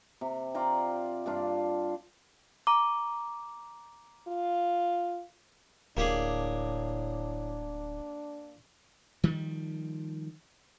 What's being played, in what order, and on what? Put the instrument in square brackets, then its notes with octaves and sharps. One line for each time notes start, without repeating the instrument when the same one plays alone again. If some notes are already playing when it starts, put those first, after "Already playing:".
[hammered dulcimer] C3
F4 D5 G5 A#5
G2 D4 F4
[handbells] A#5 D6
[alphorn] F4
[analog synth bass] D1 [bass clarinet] A2 [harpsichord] A#3 G4 G#4 [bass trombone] D4
[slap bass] D#3 F3 G3